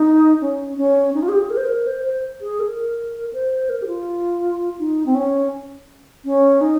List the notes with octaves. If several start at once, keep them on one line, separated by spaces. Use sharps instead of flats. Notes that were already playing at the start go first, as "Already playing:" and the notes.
Already playing: D#4
C#4
C#4
D#4
F4
G#4
G4
G#4
A#4
C5
A#4
C5
C5
G#4
A#4
C5
A#4
G4
F4
D#4
C4
C#4
C#4
D#4